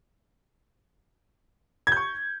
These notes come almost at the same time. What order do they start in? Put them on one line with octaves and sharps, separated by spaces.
G#6 G6 C#6